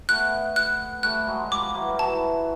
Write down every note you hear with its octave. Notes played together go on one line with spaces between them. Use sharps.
A3 B3 F#6
F#6
G3 A3 F#6
F#3 G#3
F3 G3 D6
E3 F#3
G3
E3 F#3 A5